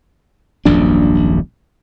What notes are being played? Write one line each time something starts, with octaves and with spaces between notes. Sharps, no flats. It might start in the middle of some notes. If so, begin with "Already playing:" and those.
D#1 A#1 F#2 D4